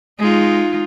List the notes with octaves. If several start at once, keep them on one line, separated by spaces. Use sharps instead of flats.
G#3 D#4 F4